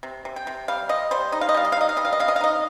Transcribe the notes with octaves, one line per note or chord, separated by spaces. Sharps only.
C3
C3
G5
C3
G3 F5
C3 D#5
G3 C5
D#4 D#5
F5
D#5
G3 F5
D#5
F5
D#4 D#5
F5
G3 D#5
F5
D#5
C3 F5
D#5
F5
D#4 D#5